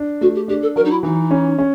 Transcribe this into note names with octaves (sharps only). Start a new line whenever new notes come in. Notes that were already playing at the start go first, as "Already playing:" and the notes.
Already playing: D4
A3 F#4
G4
D4 G4
A4
F#3 A#4
D#4
E4
E3 D#4
C#4
C#4